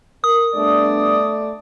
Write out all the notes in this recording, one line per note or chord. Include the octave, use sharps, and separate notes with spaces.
A#4 D#6
G3 A3 B3 D4 D5